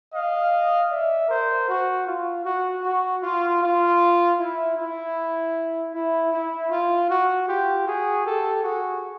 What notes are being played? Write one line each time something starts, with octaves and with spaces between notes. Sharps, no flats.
D#5 F5
D5 E5
A#4 C5
F#4
F4
F#4
F#4
F4
F4
E4
E4
E4
E4
F4
F#4
F4 G4
F#4 G#4
G4 A4
F#4 G#4